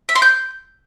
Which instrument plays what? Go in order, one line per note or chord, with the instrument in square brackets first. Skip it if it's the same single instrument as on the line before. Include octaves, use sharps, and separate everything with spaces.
[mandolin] E5
C6
G6